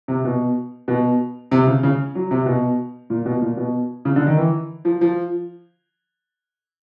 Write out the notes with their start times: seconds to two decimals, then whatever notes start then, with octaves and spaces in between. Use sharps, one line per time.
0.08 C3
0.25 B2
0.88 B2
1.51 C3
1.67 C#3
1.83 C#3
2.15 F#3
2.31 C3
2.46 B2
3.10 A#2
3.26 B2
3.41 A#2
3.57 B2
4.05 C#3
4.16 D3
4.27 D#3
4.37 E3
4.85 F3
5.01 F3